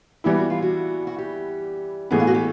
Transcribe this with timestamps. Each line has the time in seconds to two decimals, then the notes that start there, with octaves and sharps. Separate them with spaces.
0.24 E3 G3 B3 E4 G4
0.37 F#4
0.50 F4
0.62 F#4
1.07 F#4
1.18 G4
2.11 A2 E3 G#3 B3 G#4
2.20 F4
2.27 F#4
2.34 G4